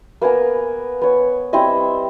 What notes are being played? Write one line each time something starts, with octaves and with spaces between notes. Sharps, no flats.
A#3 B3 G#5 A#5
B3 C#5
G3 C4 E4 D#5